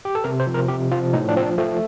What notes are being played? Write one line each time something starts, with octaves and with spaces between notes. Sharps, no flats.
G4
A4
C3 A#4
C5
F3
A#4
C3 G4
F3 F4
A2 D#4
D4
F3 C4
D4
F3 A3